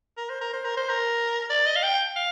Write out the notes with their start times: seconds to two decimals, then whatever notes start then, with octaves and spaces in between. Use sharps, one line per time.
0.17 A#4
0.30 C5
0.41 A#4
0.53 C5
0.65 A#4
0.77 C5
0.90 A#4
1.50 D5
1.66 D#5
1.76 F5
1.83 G5
2.16 F5